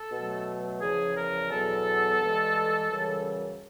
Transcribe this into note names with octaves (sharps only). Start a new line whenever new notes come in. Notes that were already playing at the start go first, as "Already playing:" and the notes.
Already playing: A4
B2 F#3 A3
E2 C#3 F3 G#4
A#4
E2 B2 F#3 B3 A4
G2 E3 G#3
F#2 C#3 E3 G3